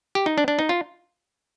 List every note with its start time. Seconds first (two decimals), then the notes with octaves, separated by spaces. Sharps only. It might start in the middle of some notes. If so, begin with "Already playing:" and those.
0.15 G4
0.26 D#4
0.38 D4
0.48 D4
0.59 D#4
0.69 F4